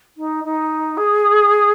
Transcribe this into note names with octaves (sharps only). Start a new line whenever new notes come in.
D#4
D#4
G#4